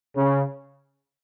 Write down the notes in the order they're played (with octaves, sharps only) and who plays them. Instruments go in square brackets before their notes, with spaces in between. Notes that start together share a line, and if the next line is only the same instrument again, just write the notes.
[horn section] C#3